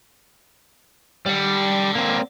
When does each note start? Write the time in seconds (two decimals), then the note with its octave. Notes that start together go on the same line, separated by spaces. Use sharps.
1.26 G3 D5 F#5
1.95 A#3 C4